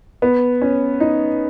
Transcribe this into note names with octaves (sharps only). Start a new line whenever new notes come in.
B3
C#4
D#4